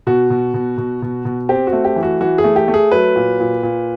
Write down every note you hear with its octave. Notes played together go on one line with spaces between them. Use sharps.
B2 F#4
B2
B2
B2
B2
B2
C4 G4
F#4
A3
G4
E3
F#4
E3 F#4
G#4
A3
G4
A3
G#4
F#3 B4
A#2
A#2
A#2